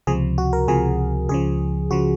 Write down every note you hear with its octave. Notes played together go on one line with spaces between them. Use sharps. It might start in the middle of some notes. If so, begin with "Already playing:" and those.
C#2 C3 F3 G#4
F#4
A#4
C#2 C3 F3 G#4
C#2 C#3 F3 G#4
C#2 C#3 F3 F#4